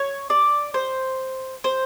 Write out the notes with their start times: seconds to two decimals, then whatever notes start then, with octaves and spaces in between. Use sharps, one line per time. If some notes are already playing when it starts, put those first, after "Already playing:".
Already playing: C#5
0.30 D5
0.74 C5
1.64 C5